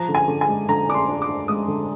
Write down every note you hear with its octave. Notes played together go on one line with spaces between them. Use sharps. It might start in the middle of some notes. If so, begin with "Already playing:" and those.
Already playing: F3 A#5
D3
G#5
D3
G#5
G#3
D3 A#5
D4 D6
C6
D4
D6
D4
G#3 D#6
D3